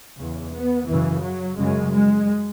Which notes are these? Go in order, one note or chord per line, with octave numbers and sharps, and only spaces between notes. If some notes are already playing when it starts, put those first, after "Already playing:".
E2 C#3
B3
F#2 C#3 E3
F#3
F#2 C#3 G#3
G#3